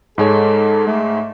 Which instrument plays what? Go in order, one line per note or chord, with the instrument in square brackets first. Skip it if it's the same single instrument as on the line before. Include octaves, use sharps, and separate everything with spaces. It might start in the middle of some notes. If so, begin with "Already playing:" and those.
[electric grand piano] G#2 G#3 C#5 [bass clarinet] A4
[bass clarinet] A3